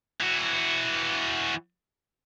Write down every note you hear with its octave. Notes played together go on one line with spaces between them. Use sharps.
E3 F#4